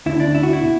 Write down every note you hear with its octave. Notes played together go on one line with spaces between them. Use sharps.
D2 D3 E4
D4
E4
F#4
E4
B2